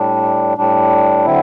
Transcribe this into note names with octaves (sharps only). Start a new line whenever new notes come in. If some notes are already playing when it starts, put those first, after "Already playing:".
Already playing: A2 G3 D4
A2 G3 D4
D3 F#3 C4 E4